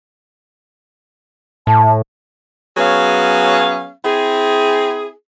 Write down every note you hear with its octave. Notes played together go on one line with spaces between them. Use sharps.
A2 A5
F#3 B3 C#4 G#4 F5
C4 E4 G#4